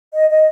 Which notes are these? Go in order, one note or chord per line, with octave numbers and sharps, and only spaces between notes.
D#5
D#5